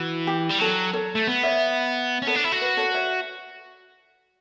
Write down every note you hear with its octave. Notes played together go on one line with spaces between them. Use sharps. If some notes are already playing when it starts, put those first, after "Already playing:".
Already playing: E3 F#4
G4
G3
F#3 A4
A4 C#5
A3
B3
C#5 E5
C#4
B3 A4 C#5
D4
E4
F#4
B4
A4 C#5
C#5 E5